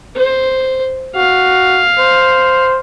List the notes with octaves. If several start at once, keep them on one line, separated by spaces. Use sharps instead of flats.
C5
F#4 F5
C5